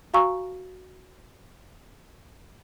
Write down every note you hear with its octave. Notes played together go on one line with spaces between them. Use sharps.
F#4 F5 G#5 A#5 C#6 E6